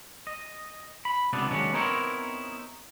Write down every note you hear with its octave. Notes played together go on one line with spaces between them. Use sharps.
D#5
B5
C#2 C3 B3 C4 D4 D5
D#2 F#3 G#3 C#4 D4
B3 C4 D#4 E4 A#4 C#5